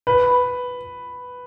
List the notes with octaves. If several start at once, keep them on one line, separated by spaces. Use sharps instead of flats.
B4